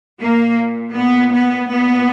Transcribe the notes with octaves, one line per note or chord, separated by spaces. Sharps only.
A#2 A#3
B3
B3
A#2 B3